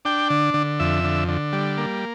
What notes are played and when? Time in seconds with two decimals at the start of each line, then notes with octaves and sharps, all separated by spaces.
0.05 D4 G5
0.30 D3
0.54 D3
0.80 F2 E5
1.04 D3
1.28 D3
1.53 G3
1.78 A#3